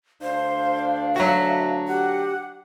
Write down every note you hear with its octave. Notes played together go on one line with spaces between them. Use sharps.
D2 D4 C5 F5
F#3 F#4 E5
G4 F#5